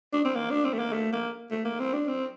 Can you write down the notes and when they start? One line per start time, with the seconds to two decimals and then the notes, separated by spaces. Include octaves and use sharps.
0.13 D4
0.25 C4
0.35 A#3
0.50 D4
0.65 C4
0.73 A3
0.79 A#3
0.93 A3
1.13 A#3
1.51 A3
1.65 A#3
1.79 C4
1.94 D4
2.08 C4